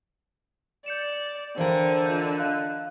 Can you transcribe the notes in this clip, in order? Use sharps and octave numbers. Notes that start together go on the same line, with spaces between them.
D5 G6 C#7 E7
D3 E3 G#4 A#4 C5 F5 G5
F4 D#5 G6
D#5 F5 F#6